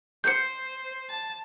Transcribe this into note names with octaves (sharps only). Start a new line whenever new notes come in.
C5 G6 C#7
A5